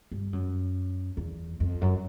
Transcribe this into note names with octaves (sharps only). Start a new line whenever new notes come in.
G2
F#2
E2
F2
F#2